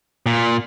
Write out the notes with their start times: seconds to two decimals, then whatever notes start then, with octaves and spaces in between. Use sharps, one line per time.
0.26 A#2